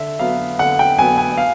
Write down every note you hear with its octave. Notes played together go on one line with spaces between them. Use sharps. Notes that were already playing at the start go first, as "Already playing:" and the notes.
Already playing: D3 E5
F#3 B3 F5
D3 F#5
G5
F#3 B3 G#5
G#5
F5